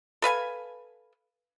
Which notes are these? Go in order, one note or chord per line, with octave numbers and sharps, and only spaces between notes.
A4 B4 F5 G#5